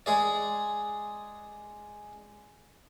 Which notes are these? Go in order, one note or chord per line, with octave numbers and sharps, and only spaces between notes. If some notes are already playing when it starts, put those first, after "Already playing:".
G#3 G#4 D5